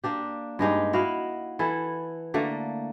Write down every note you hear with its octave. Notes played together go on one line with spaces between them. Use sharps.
A#3 D4 G4
G2 G#3 D#4 G4
E4 F#4 D#5 F5
E3 E4 A4
D3 A3 A#3